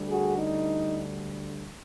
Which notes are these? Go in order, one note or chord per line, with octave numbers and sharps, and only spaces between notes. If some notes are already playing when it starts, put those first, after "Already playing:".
Already playing: D2 D3 G3
F#4 G#4
D#4